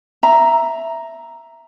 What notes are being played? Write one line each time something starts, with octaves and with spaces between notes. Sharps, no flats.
E5 A#5